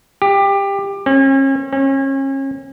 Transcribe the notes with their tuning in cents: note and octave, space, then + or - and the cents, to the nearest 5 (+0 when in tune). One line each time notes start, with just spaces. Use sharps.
G4 +20
C#4 -40
C#4 -35